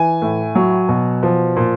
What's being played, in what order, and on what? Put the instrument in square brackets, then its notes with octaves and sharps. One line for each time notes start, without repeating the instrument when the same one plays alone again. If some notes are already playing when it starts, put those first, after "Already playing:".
Already playing: [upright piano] E3 G#5
A2
F#3
B2
F3
A#2